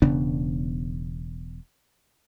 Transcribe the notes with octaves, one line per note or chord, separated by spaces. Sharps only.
E1 C#3 B3 D4